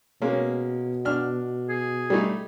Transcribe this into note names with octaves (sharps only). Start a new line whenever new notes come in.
B2 G#3 A#3 C#4
D4 F6
G#4
G3 A3 D#4